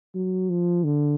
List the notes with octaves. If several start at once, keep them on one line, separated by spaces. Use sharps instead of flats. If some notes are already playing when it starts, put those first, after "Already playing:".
F#3
F3
D3